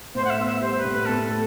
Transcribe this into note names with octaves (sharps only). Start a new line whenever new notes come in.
A2 C5
F#5
E5
B3
E5
G3 C5
B4
A2
B4
A2 A4
A4